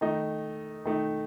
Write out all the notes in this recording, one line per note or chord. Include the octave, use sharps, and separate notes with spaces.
D#3 A3 D#4
D#3 A3 D#4